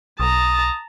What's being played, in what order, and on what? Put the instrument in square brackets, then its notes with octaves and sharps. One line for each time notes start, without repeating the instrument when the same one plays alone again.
[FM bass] B1 [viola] A5 A#5 [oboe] D#6